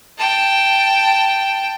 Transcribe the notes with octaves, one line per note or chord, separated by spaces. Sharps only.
G5 A5